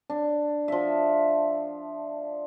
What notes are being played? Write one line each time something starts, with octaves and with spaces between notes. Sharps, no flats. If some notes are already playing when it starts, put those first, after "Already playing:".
D4
F3 E5